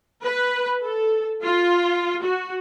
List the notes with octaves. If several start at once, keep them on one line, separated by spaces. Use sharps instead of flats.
B4
A4
F4
F#4